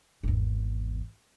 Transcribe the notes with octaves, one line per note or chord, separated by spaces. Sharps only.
G#1 E2